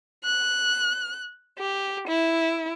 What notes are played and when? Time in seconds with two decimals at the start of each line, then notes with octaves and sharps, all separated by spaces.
0.25 F#6
1.59 G4
2.07 E4